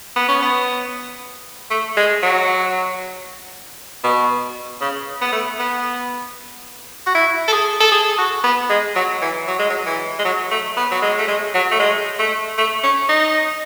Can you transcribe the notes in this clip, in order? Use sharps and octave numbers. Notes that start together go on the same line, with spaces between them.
B3
C#4
B3
A3
G#3
F#3
B2
C#3
B3
A3
B3
F#4
E4
A4
G#4
A4
G#4
F#4
B3
G#3
F#3
E3
F#3
G#3
F#3
E3
G#3
F#3
A3
B3
F#3
G#3
A3
G#3
F#3
A3
G#3
A3
A3
C#4
D#4